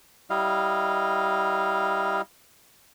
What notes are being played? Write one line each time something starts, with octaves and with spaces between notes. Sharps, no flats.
G3 E4 D#5 F5